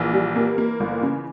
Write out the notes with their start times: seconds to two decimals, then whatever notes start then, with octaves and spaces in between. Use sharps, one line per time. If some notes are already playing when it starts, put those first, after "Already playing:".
Already playing: A#1 E3
0.14 G3
0.36 A#3
0.58 A#3
0.80 G1
1.02 C#3